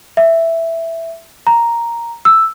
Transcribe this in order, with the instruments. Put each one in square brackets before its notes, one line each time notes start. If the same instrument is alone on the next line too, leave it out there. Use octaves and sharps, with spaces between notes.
[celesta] E5
A#5
E6